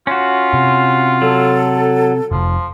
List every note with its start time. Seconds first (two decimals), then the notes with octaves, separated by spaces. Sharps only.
0.07 C#4 F4 F#4
0.54 C3
1.22 F#3 A4
2.32 F1 F3